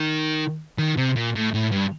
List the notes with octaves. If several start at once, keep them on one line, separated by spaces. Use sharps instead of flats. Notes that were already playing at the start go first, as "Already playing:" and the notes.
Already playing: D#3
D#3
C3
A#2
A2
A2
G2